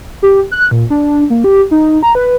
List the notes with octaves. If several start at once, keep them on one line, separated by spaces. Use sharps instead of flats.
G4
F#6
A#2
D4
A#3
G4
D#4
A#5
B4